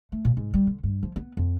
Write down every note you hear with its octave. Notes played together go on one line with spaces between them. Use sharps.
A3
A#2
G#2
G3
D3
G2
F3
B3
F2